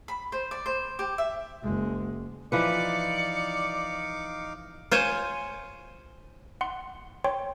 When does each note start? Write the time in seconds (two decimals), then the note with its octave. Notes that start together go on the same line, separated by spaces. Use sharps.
0.08 B5
0.32 C5
0.51 D5
0.66 C5
0.99 G4
1.18 E5
1.63 F#1 G#3
2.52 E3 F3 D#4 B4 D5 F5 D6 C#7
4.91 F4 C5 C#5 G#5
6.61 F#5 C6
7.24 C#5 G5 C6